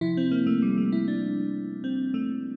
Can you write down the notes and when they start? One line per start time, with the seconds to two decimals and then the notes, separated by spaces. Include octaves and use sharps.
0.01 C3 F3 E4
0.17 C4
0.31 A#3
0.47 A3
0.62 G3
0.78 A3
0.92 E4
1.08 D4
1.84 C4
2.14 A3